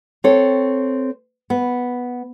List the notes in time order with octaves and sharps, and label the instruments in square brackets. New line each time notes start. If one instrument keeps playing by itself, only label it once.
[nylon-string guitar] C4 A4 C#5
B3